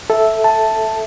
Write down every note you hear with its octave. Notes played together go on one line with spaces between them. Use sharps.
A4 E5
A5